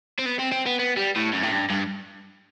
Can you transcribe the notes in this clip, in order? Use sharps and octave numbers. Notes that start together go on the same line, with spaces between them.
C4
B3
C4
C4
B3
B3
G3
A2
F#2
A2
G2
G2